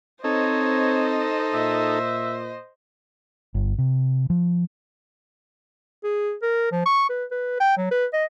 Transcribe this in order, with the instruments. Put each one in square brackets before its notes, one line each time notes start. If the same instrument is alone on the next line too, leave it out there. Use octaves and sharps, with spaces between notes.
[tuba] C4 [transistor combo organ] D#4 A4 [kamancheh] C5 D#5 [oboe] C#5
[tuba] A#2 [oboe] E5
[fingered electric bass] G1
C3
F3
[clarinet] G#4
A#4
F3
C#6
B4
B4
G5
F#3
B4
D#5